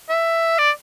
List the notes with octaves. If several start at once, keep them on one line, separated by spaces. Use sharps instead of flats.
E5
D5